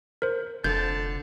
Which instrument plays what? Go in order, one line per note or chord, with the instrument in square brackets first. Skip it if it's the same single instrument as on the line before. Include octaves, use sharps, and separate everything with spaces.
[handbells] A#4 C5
[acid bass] F1 [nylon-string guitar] D3 [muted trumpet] A5 [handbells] G6